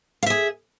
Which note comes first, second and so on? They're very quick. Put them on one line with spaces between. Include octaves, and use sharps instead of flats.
F5 E5 G#4